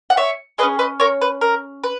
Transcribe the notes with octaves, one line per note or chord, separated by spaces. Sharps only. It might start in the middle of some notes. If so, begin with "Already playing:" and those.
F#5
C#5 E5
C#4 G#4 B4 D#5
B4 D#5
A#4 C#5
B4
A#4
B4